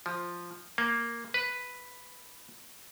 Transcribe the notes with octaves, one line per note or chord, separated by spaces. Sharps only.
F3
A#3
B4